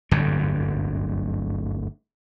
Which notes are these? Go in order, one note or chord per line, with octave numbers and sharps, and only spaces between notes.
D1 G1 F#2 D3